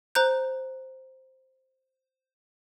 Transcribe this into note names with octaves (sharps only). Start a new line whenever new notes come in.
C5 A#5 F#6 G6